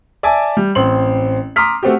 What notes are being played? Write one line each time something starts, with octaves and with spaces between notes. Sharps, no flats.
D5 E5 G#5 A5 D6
G3
A1 C4 C6 F#7
A#5 C6 D6 D#6 F6 B6
A3 C4 F#4 G4